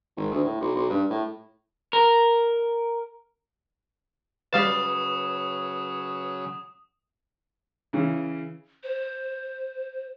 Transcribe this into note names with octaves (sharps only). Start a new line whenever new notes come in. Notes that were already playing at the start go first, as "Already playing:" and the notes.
G#1
D2
A2
B1
B1
G2
A2
A#4
C#3 F#3 G3 B4 F5 D#6 A6 E7
C#3 E3
C5